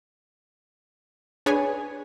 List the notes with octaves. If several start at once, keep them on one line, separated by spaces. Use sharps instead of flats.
D4 G#4 B4 C#5 G#5